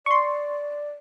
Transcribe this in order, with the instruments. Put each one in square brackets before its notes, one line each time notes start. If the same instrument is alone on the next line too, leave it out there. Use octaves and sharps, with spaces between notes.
[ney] D5 [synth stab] C6 C#6